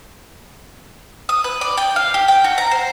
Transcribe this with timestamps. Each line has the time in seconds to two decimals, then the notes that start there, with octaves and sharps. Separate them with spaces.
1.29 D#6
1.44 B4
1.61 D5
1.77 G5
1.96 F5
2.14 G4
2.28 G5
2.44 F#4
2.58 A#5
2.71 C5